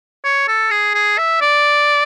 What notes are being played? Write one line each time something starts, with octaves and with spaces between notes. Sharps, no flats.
C#5
A4
G#4
G#4
E5
D5